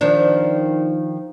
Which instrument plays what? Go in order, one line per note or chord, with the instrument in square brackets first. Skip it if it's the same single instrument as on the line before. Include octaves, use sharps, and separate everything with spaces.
[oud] D#3 F3 D4